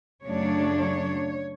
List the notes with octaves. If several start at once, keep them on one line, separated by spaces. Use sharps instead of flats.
F#2 C#3 F#3 A3 D4 C#5
C#5